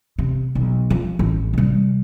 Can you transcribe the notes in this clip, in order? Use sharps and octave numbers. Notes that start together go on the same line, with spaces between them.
C3
B1
F3
A1
C3 G3